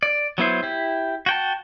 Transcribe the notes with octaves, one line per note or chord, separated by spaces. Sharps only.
D5
F#3 B3 E4 C5
E4 G4
F#4 G5 A5